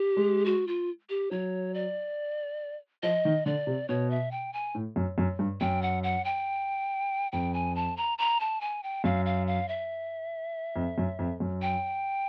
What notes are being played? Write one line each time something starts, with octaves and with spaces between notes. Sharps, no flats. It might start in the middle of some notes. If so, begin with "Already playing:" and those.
Already playing: G4
G#3
F#4
F4
G4
F#3 C#5
D5
F3 D#5
D#3
D3 D5
C3
B2 C#5
E5
G5
G#5
A2
F#2
F#2
G2
F#2 G5
F#5
F#5
G5
F2 G5
G#5
A5
A#5
A#5
A5
G#5
G5
F#2 F5
F5
F5
E5
F2
F#2
F2
F#2
G5